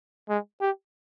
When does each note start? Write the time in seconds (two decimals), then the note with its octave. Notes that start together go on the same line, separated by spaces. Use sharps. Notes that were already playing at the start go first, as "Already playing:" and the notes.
0.29 G#3
0.61 G4